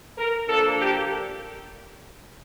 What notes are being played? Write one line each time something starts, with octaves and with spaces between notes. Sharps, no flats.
A#4
F3 A#3 D4 A4
G4